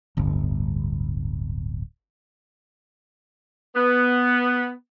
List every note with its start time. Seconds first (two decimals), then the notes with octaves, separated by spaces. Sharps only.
0.17 D1 G1
3.76 B3